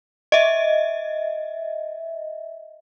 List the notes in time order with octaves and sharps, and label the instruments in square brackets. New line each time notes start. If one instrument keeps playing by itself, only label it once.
[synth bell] D#5 E5